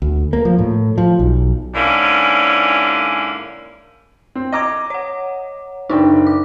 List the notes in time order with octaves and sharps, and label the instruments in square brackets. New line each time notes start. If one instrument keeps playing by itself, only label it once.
[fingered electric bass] D2
A#3
F3
A2
F3
B1
[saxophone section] G#2 D3 A#3 C#4 E4
[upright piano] C4
[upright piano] D#5 A#5 D6 [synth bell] G#6 A#6
[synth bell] C#5 F#5
[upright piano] F#1 D5 G5 [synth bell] D4 D#4
[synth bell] D6